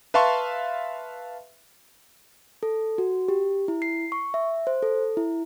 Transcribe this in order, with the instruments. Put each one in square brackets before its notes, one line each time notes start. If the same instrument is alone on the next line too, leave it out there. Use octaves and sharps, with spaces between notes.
[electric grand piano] B4 E5 F5 A5 C6 C#6
[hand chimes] A4
F#4
G4
E4
C7
C#6
E5
C5
A4
E4